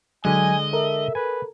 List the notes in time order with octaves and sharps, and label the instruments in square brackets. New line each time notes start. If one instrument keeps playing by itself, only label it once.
[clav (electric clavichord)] D3 G#3 [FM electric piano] F#3 [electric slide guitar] D#5 [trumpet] G#5
[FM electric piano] A4 A#4 [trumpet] E5
[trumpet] B4 [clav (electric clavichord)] G#5